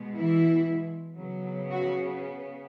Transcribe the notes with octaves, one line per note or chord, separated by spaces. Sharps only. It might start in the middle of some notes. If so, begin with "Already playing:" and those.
Already playing: B2 G#3 B3
E3 E4
C#3 F#3 B3
F#3 F#4